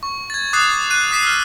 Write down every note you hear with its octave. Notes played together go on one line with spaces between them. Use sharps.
C#6
G#6 A6
D6 D#6 F#6 A6 C7
F#6 D#7
D#6 B6 C7 E7
E6 F6